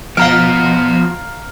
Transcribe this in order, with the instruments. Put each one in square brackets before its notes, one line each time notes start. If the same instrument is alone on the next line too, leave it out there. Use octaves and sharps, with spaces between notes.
[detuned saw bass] F3 [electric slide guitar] B3 F#4 [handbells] F5 A#5 D7 [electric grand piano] F6